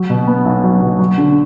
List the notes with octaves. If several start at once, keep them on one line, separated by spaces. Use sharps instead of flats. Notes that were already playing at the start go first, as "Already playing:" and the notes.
Already playing: F#3
B2
B3
B1
F#3
B2
F#3
D3